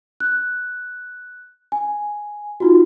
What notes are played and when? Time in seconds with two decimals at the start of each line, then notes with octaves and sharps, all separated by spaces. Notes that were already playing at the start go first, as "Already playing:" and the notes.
0.20 F#6
1.72 G#5
2.60 D#4 F4 F#4